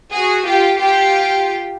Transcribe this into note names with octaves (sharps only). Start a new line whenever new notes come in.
F#4 G#4
F4 G4
F4 G4